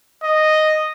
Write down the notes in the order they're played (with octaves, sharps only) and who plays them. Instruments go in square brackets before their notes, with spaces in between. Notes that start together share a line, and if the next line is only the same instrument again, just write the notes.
[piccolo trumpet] D#5